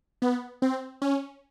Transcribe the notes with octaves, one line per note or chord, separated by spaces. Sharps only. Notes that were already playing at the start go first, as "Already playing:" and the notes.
B3
C4
C#4